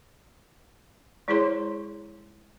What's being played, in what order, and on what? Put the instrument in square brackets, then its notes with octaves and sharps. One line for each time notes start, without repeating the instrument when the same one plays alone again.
[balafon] G#3 E4 G#4 C5 C#5 C6